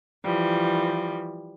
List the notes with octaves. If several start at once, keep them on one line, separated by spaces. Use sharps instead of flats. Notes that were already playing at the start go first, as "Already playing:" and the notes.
E3 F3 G3